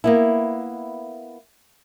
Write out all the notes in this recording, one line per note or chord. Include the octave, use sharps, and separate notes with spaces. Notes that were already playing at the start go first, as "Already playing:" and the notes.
A#3 B3 E4